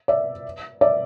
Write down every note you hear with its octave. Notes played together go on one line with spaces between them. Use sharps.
D5 E5
D5 E5